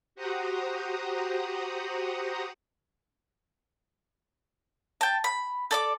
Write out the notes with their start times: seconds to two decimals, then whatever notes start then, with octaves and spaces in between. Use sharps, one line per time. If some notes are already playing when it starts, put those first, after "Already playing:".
0.15 F#4 G4 C5 F#5 A#5 D#6
5.01 G5 A5
5.24 B5
5.71 A4 D5 D6